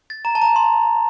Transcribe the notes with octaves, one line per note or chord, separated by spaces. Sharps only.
A6
A#5
A5
A#5
C6